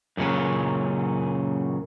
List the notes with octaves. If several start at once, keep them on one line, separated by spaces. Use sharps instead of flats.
F#2 A#2 C#3 C#4